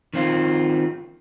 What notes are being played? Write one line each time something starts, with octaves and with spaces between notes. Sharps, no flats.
D#3 C4 F4